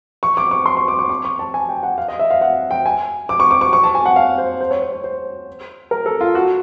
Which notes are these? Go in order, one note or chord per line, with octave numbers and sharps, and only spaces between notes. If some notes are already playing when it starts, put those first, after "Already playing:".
C#6
D6
C#6
C6
C#6
D6
C#6
D6
C#6
A5
G#5
G5
F#5
F5
D#5
E5
F5
F#5
G5
G#5
D6
C#6
D6
C#6
C#6
A5
G#5
F#5
F5
C5
C5
C#5
C#5
C#5
C5
A#4
A4
F4
F#4